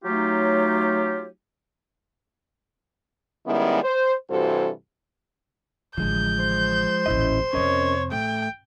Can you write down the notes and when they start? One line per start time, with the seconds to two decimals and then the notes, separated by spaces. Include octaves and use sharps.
0.05 F#3 A3 D#4 F4 G4 C#5
3.46 D#3 G3 G#3 B3 C#4 E4
3.83 C5
4.30 G2 C3 E3 F#4 A4 C5
5.97 A1 D3 F3 G#3 G6
6.40 C5
7.06 D#1 A1 C#4 E4 D#5
7.53 F2 C3 C#4 A#4 C#5 D#5
8.12 A1 A3 G5